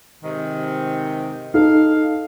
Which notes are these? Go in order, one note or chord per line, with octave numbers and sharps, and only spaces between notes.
G#2 C3 D#3
D#4 A4 F5